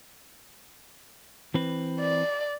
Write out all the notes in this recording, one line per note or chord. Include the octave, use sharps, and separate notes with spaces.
E3 C4 B4
D5